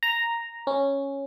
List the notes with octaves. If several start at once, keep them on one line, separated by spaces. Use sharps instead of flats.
A#5
C#4